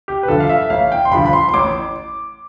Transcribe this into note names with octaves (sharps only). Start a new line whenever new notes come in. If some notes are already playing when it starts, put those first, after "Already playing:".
G4
B4
G2 D3 F3 A4
F5
E5
A1 F5
G5
C6
G2 D3 F3 B5
B5
C6
C6
A1 D6